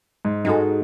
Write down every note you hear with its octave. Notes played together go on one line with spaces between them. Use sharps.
G#2
G#3 D#4 F#4 A4